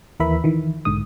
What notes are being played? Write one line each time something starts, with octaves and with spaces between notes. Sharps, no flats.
D#2 E3 A#4 B4 E5 B5
D#3 E3
B1 G#2 D3 D#6